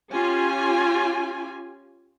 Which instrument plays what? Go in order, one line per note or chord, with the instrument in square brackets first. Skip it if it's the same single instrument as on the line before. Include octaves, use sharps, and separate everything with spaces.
[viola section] C#4 F4 G4 G#5